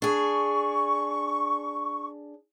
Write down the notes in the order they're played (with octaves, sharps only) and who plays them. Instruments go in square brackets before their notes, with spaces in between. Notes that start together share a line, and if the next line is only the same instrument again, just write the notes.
[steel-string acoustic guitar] D4 G#4 [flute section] C#6